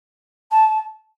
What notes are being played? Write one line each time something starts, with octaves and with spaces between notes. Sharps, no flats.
A5